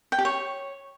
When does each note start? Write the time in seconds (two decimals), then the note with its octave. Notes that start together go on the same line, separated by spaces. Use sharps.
0.12 G5
0.18 G4
0.25 C#5